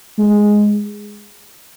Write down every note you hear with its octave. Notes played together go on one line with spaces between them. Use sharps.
G#3